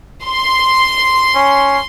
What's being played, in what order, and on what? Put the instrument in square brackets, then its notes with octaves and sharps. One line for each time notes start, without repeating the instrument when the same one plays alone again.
[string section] C6
[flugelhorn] C#4